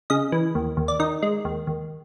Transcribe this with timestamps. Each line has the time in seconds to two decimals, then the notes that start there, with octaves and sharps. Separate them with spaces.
0.10 C#3 D#5
0.32 E3
0.55 D#2
0.77 D#2
0.88 D5
1.00 D#3 D#5
1.23 G#3
1.45 D#2
1.67 D#2